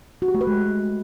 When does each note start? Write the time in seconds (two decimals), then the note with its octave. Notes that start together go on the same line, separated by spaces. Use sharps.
0.22 F#4
0.28 G4
0.35 A3
0.41 B4
0.47 G#3